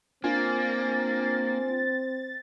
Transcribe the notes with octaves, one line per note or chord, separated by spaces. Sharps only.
A#3 C4 D4 F4 G#5 A6